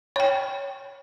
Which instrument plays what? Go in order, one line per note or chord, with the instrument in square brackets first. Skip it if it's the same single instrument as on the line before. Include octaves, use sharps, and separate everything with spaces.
[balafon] C#5 G5